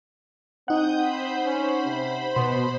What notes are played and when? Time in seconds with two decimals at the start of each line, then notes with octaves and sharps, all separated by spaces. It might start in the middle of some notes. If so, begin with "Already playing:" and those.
0.68 C4 D#4 F#5 D#6 G6
0.97 C5 B5
1.45 C#4
1.85 C3
2.36 B2 B3 C6